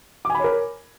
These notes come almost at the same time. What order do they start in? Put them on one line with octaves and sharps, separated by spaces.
D6 G#5 B5 C#5 A#4